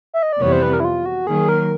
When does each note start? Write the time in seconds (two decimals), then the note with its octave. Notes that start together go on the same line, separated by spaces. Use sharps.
0.14 E5
0.23 D#5
0.33 D5
0.41 F2 C3 E3 G3 B3 C#5
0.52 C5
0.62 B4
0.73 A#4
0.80 E4
0.85 F4
1.06 F#4
1.27 D#3 F#3 A#3 G#4
1.49 A#4